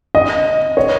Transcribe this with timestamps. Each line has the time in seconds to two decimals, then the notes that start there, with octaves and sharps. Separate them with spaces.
0.15 D#5
0.77 C#5